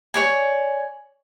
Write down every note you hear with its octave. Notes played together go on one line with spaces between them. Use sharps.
C#5 D5 G#5